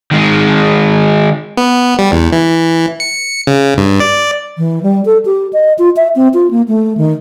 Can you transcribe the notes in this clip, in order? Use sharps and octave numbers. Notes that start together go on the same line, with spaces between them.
D#3 G#3
B3
G3
E2
E3
C#7
C#3
G2
D5
E3
G3
A4
G4
D#5
F4
E5
C4
F4
A#3
A3
D#3